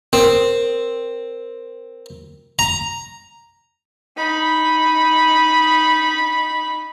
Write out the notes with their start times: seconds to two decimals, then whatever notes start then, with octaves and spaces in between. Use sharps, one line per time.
0.13 C4 A#4
2.59 A#5
4.17 D#4 B5